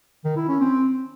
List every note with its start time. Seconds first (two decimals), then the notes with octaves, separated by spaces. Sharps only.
0.25 D#3
0.37 E4
0.49 C#4
0.61 C4